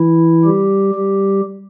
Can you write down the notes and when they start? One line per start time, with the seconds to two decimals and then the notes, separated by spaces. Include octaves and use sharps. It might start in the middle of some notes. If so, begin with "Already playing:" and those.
Already playing: E3 E4
0.45 G3 G4
0.95 G3 G4